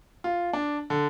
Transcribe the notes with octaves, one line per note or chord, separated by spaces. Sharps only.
F4
D4
D3